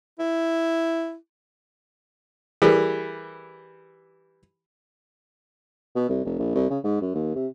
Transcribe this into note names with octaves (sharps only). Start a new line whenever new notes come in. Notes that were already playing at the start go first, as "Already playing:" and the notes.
E4
E3 G3 G#4 A#4
B2
C2
F1
A#1
C2
C#3
G#2
F#2
D#2
C3